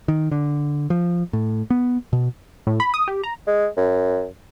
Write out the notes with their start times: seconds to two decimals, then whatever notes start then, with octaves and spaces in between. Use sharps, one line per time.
0.08 D#3
0.31 D3
0.90 F3
1.33 A2
1.70 B3
2.13 B2
2.67 A2
2.80 B5
2.94 D#6
3.08 G4
3.23 A#5
3.47 G#3
3.77 F#2